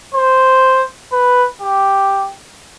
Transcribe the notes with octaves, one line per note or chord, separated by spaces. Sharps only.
C5
B4
G4